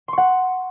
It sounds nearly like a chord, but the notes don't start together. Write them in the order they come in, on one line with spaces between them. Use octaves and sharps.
C6 C#6 F#5